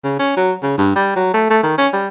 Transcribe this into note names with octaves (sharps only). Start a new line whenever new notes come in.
C#3
C#4
F#3
C#3
G2
G3
F#3
A3
A3
D#3
C#4
G3